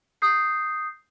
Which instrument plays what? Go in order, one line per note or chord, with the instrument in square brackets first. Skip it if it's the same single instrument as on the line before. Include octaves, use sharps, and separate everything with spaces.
[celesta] D#6 G6 C7